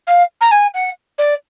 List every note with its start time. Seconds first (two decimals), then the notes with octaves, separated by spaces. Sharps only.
0.07 F5
0.40 A#5
0.51 G#5
0.74 F#5
1.18 D5